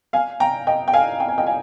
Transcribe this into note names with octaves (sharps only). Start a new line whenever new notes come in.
F5 G#5
G5 A#5
D#5 G5
G5
F5 G#5
G5
G#5
D#5 G5
F5 G#5